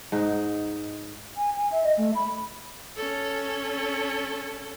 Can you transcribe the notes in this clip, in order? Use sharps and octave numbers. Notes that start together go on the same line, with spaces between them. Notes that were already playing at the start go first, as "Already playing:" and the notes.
G#2 D#4
G#5
G#5
E5
D#5
A3
B5
C#4 A4